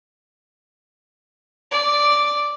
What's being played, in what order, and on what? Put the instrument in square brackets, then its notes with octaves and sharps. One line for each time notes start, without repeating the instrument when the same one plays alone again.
[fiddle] D5